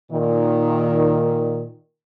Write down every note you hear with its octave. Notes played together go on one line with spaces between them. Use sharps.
A#2 D#3